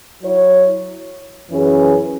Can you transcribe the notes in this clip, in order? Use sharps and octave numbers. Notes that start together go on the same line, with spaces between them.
F#3 E4 C#5
F#2 E3 C#4 G#4 B4